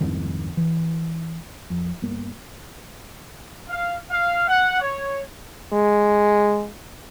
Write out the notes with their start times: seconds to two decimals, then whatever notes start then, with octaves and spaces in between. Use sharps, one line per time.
0.01 C2 F2 G#2 D#3
0.57 E3
1.70 F2
2.02 G1 A#3
3.69 F5
4.10 F5
4.48 F#5
4.80 C#5
5.73 G#3